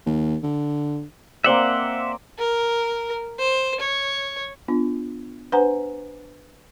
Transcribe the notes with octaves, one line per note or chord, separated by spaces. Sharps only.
D#2
D3
A#3 C4 D5 E5 F#5 C6
A#4
C5
C#5
B3 D4 F4
D4 B4 C5 F#5 G#5 A#5